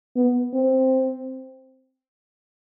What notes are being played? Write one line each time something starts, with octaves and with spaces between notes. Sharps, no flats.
B3
C4